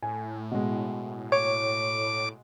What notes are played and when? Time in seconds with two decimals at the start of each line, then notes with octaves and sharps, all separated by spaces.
0.03 A2 G#5
0.51 B2 G#3
1.32 C#5 D6